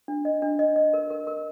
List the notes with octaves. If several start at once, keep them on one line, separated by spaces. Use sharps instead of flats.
D4
D#5
D4
D#5
D#5
A#4
A#4
A#4